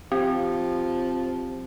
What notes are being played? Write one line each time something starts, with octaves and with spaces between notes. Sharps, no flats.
F3 C4 G4